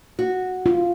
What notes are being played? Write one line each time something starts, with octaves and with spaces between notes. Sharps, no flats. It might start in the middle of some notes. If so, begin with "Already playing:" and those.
F#4
F4